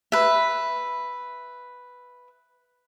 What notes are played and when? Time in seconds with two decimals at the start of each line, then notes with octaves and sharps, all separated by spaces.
0.12 B4 E5